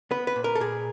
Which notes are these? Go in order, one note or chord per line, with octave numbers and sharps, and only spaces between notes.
B3 B4
B4
A#2
A#4
A4
A#2 G#4